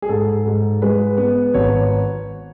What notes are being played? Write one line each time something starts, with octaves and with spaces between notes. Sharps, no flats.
G#4
G#2 A4
G#2
G#3 B4
B3
G#1 C#5